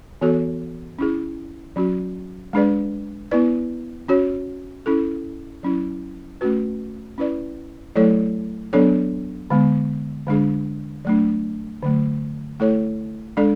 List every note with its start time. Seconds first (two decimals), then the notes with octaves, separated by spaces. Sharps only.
0.21 E3 B3 F#4 A4 C#5
0.99 C#4 E4 G#4
1.76 F#3 C#4 F#4
2.53 G#3 D4 G#4 B4 D5
3.31 B3 E4 B4 D5
4.08 C#4 F#4 C#5
4.86 C#4 E4 A4
5.63 F#3 C#4 E4
6.41 A3 C#4 F#4 B4
7.18 C#4 E4 B4 D5
7.96 F#3 A3 E4 A4 C#5
8.73 F#3 B3 D4 A4 C#5
9.50 D3 G#3 B3
10.27 D3 G#3 D4 G#4
11.05 F#3 A3 D4
11.83 D3 F#3 A3
12.60 A3 E4 A4 C#5
13.37 G#3 D4 A4 D5